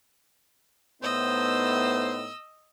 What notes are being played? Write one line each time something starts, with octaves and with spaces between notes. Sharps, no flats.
A2 B3 D#4 C5 D#5 E6